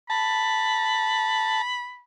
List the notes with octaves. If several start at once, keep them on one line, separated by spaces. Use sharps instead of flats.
A5 B5